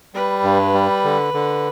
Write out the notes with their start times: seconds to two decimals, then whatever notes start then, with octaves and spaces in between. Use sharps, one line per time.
0.14 G3 B4
0.44 G2
0.74 G3
1.04 D3
1.34 D3